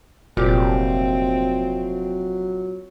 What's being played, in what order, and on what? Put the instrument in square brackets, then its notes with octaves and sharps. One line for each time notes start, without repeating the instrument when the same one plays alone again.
[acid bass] F1 [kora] A#2 G4 [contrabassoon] F#3 [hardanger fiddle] C4